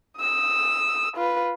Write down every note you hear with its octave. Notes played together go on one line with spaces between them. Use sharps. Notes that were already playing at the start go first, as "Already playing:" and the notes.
D#6 E6
F4 B4